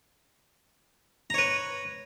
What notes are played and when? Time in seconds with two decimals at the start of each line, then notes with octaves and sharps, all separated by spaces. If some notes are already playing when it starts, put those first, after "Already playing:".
1.30 A#5
1.34 C#5
1.38 B4